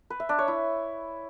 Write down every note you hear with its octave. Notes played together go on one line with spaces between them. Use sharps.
B4
E5
D4
C#5
E4